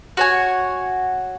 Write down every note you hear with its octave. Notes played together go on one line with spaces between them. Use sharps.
F#4 C#5 G#5